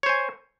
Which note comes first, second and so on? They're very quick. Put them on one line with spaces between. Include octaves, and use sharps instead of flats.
C#5 C5 G#5